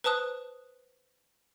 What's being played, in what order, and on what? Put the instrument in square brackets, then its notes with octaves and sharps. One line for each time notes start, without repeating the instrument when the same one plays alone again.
[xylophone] B4 C5 A5 D#6 F#6